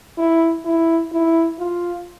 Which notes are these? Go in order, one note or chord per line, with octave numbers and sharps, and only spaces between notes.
E4
E4
E4
F4